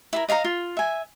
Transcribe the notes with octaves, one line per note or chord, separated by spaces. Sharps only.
E4 G#4 A#4
D#5 F5 G#5 A#5
F4
E5 G#5